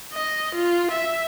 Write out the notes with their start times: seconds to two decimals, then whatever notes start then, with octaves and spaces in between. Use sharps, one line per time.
0.13 D#5
0.55 F4
0.92 E5